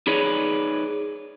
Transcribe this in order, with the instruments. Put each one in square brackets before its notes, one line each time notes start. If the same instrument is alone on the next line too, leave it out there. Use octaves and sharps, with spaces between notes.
[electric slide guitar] D#4 G#4 B4 C#5 D5